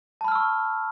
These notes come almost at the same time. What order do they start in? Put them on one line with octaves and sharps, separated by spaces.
A5 B5 F6 E6 C#6